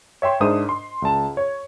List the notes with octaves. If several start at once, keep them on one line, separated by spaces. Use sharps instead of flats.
C#5 E5 G5 C6
G#2 D4 A#4 C5 E5 D#6
C6
C#2 A5
C#5